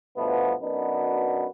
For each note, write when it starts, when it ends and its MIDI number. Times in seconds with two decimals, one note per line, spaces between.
0.17 0.53 43
0.17 0.53 47
0.17 0.53 53
0.17 0.53 57
0.17 0.53 59
0.62 1.46 42
0.62 1.46 59
0.62 1.46 62
0.62 1.46 63
0.62 1.46 66
0.62 1.46 71